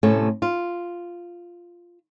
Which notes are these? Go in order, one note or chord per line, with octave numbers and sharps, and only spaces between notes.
A2 C3 A3 C#4 A4
F4